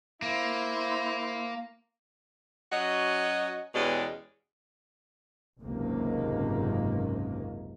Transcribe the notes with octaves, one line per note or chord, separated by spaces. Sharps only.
A#3 E4 C5
F#3 C#4 F#4 D#5
E2 B2 G#3 C#4 G4 D5
F#1 C#2 G#2 C3 D#3 A#3